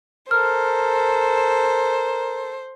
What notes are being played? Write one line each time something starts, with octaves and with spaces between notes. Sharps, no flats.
A4 A#4 C5 F6